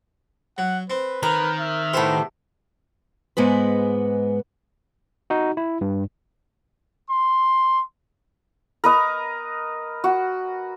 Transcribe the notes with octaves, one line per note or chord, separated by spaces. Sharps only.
F#3 F#5
C4 B4
D#3 A#4 B4
E5
A2 B3 G4 C5
G#2 G#3 B3 B4
D#4 F#4
E4
G2
C6
A#4 B4 D#5
F#4